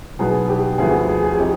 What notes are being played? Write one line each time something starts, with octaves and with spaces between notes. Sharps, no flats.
B1 B2 B3 G#4
G4
D2 D3 F3 B3 G#4
G#4
G#4
G#4
F3 C4 D#4 G4